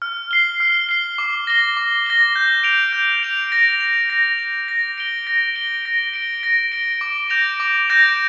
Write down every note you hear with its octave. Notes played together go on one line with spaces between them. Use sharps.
F6
C7 G7
F6
C7 G7
D6
A#6 G7
D6
A#6 G7
G6
D7 F7
G6
D7 F7
A#6
F7
A#6
F7
A#6
D7 G7
A#6
D7 G7
A#6
D7 G7
A#6
D7 G7
D6
G6 A#6 D7 F7
D6
G6 A#6 D7 F7